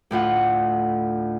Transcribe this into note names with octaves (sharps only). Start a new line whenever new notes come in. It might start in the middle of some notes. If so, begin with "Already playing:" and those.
D2 A2 F4 F#5